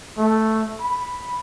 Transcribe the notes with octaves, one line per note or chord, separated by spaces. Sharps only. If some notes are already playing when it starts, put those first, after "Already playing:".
A3
B5